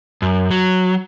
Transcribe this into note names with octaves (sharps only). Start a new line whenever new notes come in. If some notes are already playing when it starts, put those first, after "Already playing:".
F#2
F#3